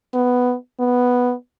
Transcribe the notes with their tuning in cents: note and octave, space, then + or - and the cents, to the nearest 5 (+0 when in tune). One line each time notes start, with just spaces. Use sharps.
B3 +5
B3 +0